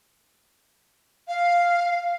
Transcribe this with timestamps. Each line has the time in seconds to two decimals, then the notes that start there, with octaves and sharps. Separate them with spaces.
1.28 F5